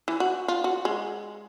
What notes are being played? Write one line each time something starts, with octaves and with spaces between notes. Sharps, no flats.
E3
F#4
F4
F#4
G#3